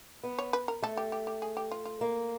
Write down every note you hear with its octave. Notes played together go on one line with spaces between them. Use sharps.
B3
C#5
B4
A#4
A3 A4
G4
G4
G4
G#4
G4
F4
F4
A#3